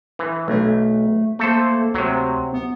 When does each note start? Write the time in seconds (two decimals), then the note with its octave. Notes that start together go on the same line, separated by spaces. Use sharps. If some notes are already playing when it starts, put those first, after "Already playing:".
0.19 E3
0.48 B1 A3
1.39 A3 A#3 A4 C5
1.94 D2 C3 F#3
2.53 B3